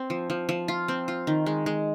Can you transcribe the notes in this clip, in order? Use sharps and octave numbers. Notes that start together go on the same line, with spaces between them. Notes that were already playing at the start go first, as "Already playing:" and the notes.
Already playing: C4
F3
F3
F3
F4
C4
F4
D#3
G#3
G#3